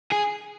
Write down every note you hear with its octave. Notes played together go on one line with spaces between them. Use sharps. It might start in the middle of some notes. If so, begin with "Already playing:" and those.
G#4